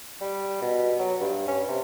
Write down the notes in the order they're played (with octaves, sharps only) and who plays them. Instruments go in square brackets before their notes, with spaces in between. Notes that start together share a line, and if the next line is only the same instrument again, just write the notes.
[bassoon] G3
B2
F#3
G2
C#4
C3